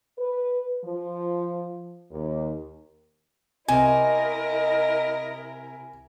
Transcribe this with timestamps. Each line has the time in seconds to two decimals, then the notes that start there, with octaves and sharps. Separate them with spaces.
0.19 B4
0.85 F3
2.11 D#2
3.68 C3 E4 A#4 D#5 G#5